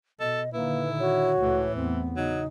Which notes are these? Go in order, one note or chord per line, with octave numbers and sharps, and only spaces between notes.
B2 A4 D#5
A#2 D3 D#3 A#3 E4 B4
F#4 C#5
C#2 A2 E3 A3
E2 B3 C4
C#3 F#3 D#4